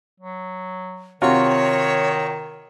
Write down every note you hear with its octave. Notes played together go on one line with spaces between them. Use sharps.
F#3
C3 D#3 F4 F#4 C#5